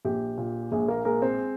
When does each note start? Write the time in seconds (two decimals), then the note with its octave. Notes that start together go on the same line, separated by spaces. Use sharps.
0.05 A#1 G4
0.38 A#2
0.72 A#1 G#3 G#4
0.88 A#3 A#4
1.05 G#3 A#3 A#4
1.22 C4 C5